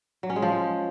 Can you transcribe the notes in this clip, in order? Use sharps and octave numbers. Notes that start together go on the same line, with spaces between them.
F#3
C#4
G#3
F3